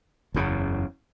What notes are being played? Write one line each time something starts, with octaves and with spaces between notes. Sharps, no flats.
F#1 E2 C#3